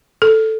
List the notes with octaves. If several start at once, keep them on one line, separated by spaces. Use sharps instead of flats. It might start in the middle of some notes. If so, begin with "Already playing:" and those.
A4